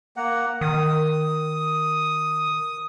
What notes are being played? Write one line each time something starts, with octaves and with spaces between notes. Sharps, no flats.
A#3 F#5
D#3 D#6